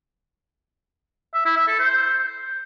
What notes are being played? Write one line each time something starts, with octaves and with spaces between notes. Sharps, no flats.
E5
E4
E5
A4
C5